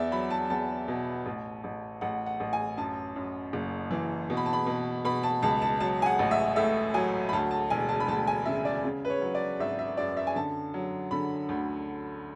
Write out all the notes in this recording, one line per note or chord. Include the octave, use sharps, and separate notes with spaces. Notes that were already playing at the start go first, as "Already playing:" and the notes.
Already playing: E2 D5 E5
F#3 B5
A5
E2 A5
B2
A1
A1
A1 F#5
F#5
A1
G#5
F#2 A5
F#2
F#1
E3
B2
B5
A5
B5
B2
B2 B5
A5
C#2 A5
A5
F#3 A5
G#5
F#5
A1
E5
A2 E5
F#3 G#5
B5
D2 A5
A5
E1 G#5
A5
B5
D2 A5
G#5
C#3 E5
D5
C#3
B4
C#5
F#3
D5
G#1 E5
E5
F#2 D5
E5
G#5
D3 A5
F#3
D3 B5
D2